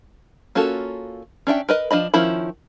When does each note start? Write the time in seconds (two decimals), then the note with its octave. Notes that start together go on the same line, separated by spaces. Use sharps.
0.55 A#3 C#4 F4 F#4 A4
1.47 C#4 D4 E5 G5
1.69 A#4 B4 D#5
1.91 F3 D4 D#5 B5
2.14 D#3 F3 C#4 E4 B5